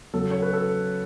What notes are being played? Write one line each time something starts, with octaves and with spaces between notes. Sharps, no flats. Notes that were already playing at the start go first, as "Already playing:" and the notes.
C#3 F#3 A4
C#5
B4
A4